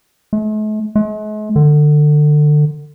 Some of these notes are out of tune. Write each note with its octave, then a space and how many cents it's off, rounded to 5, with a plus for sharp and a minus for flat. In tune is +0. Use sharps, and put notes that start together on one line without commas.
A3 -45
G#3 +45
D3 +25